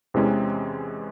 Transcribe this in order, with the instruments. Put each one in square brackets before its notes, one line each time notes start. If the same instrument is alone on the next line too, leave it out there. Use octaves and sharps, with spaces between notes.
[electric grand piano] E2 C3 E3 G#3 C#4